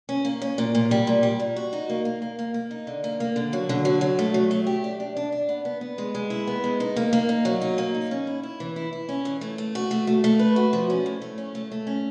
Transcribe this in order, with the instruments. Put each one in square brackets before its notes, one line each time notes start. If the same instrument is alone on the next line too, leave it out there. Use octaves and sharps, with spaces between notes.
[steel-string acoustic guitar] C#4
A#3
C#4
A#2
A#2
G3
A#2
G3
A#2
F#4
D#4
A#3
A#3
A#3
A#3
A#3
D#4
D3
A#3
A#3
D3
F#3
D3
F#3
F#3
A3
F#3
A3
G4
D4
D4
D4
D4
B3
B3
B3
G#3
G#3
E4
B3
G#3
D#4
A#3
A#3
D#4
F#3
D#4
A#3
D#4
C#4
E4
E4
E3
E4
E4
C#4
E3
A3
A3
F#4
A3
A3
A3
B4
F#4
F3
C#4
A2
A3
C#4
A3
A3
C#4